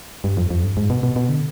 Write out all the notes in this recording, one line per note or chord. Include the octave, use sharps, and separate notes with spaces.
G2
F2
F2
G2
G#2
B2
B2
B2
D3